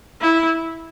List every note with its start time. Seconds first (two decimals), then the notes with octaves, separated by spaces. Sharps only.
0.21 E4